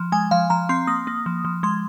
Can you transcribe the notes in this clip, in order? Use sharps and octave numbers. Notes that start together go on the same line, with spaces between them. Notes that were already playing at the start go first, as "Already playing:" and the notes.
Already playing: F3
G#3 G#5
F3 F5
F3 A#5
C4 C6
A#3 D#6
A#3
F3
F3
G#3 C6